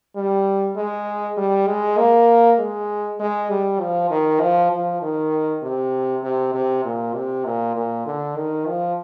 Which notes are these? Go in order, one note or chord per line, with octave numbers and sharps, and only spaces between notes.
G3
G#3
G3
G#3
A#3
G#3
G#3
G3
F3
D#3
F3
F3
D#3
C3
C3
C3
A#2
C3
A#2
A#2
D3
D#3
F3